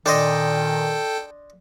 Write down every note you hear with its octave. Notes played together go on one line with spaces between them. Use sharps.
A#2 D#3 D4 A4 C5 D#5 G5